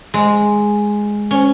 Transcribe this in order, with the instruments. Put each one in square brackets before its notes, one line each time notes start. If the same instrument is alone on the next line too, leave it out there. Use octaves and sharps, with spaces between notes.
[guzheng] G#3
C#4